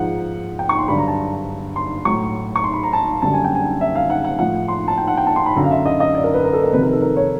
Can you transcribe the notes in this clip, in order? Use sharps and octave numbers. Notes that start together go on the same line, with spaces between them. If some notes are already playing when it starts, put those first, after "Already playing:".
Already playing: G#2 F3 F#5
G5
C#6
C6
G2 D3 F#3 B5
A#5
A5
C6
A2 F#3 C#6
C#6
C6
B5
A#5
A5
F#2 D3 G3 A5
G#5
G5
G#5
E5
F5
F#5
F#5
A2 F3 F#5
C6
A5
G5
F#5
G5
A5
C6
B5
F#2 D3 F#3 A#5
F5
E5
D#5
D#5
D5
A#4
B4
A#4
A4
A#4
F2 C3 D#3 B4
A#4
A4
A#4
C#5